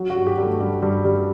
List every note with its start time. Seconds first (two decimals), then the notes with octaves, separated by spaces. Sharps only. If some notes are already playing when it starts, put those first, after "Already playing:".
Already playing: F#3
0.10 F#4
0.16 G2
0.27 G4
0.38 G2
0.43 A3
0.60 G2 G3
0.82 G2 G3
1.05 G2 G3